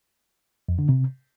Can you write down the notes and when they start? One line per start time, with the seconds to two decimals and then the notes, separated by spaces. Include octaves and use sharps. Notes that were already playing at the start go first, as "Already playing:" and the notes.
0.69 F2
0.79 D3
0.89 C3